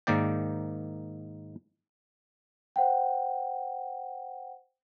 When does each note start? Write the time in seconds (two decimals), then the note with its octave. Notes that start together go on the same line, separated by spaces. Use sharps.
0.07 G#2 D#3 A#3 D5 G5
2.76 C5 F#5 G5